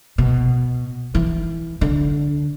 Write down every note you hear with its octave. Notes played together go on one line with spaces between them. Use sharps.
B2
E3
D3